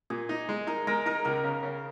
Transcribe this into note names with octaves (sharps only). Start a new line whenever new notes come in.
A#2 G#4
D#4
G#3
D#4 A#4
G#3 A#4
D#4 A#4
C#2 A#4
C#3
C#3